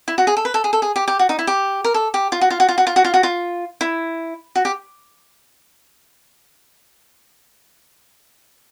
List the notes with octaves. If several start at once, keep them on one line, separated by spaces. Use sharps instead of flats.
E4
F#4
G#4
A4
B4
A4
G#4
A4
G#4
G4
G4
F#4
D#4
E4
G4
A#4
A4
G4
F4
F#4
F4
F#4
F4
F#4
F4
F#4
F4
F#4
F4
E4
F#4
G4